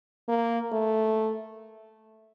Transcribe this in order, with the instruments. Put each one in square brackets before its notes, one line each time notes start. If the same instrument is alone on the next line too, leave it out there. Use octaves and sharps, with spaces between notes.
[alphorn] A#3
A3